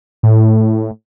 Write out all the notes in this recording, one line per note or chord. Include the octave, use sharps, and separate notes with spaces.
A2